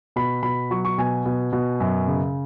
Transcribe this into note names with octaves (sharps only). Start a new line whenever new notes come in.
B2 B5
B2 B5
F#3 C#6
C#6
B2 G#5
B2
B2
F#2
C#3